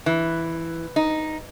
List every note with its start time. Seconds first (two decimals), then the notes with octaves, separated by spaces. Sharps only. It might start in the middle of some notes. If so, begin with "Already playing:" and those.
0.06 E3
0.96 D#4